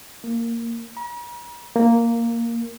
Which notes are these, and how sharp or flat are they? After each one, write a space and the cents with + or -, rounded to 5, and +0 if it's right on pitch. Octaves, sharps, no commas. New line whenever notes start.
A#3 -10
A#5 +45
A#3 -5